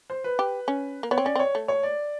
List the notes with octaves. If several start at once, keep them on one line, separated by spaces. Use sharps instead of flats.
C5
B4
G4
C#4
A#3
B3 C#5
C4
C#4 D5
C4
C#5
A3
C#5
D5